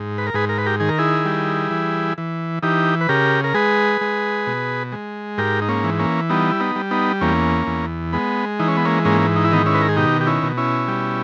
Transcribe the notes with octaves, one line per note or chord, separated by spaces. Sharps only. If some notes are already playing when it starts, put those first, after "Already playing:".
Already playing: G#2
B4
A#4
G#2 G#4 B4
A#4
B4
G4 A#4
D#3 G#4
A#4
E4 G#4
G3
E3
E3
E3 D#4 G4
B4
C#3 G4 A#4
A#4
G#3 G#4 B4
G#3
B2
G#3
G#2 G4 A#4
D#4
A#3 C#4
E3
A#3 C#4
G3 B3 D#4
E4
B3 D#4
G3
B3 D#4
E2 A#3 C#4
E2
G#3 B3
E3 D#4
C#4
B3
A#3 C#4
G#2 A#3 C#4
D#4
E4
D#3 B3 D#4
C#4 E4
B4
A#4
G#4
B2 D#4 G4
G4
C#4 E4
B2
C#4 E4
G3